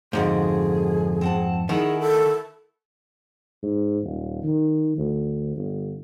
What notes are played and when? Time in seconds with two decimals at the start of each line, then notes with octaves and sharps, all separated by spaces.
0.13 F2 G#2 D3 F#4 G#4
1.21 C4 F#5 A5
1.69 D#3 E4 G#4 A#4 F#5
2.00 A4
3.63 G#2
4.04 D#1
4.44 D#3
4.98 D2
5.57 G1